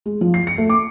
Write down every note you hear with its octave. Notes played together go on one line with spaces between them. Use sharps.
G#3
F3
C7
C#7
A3
D6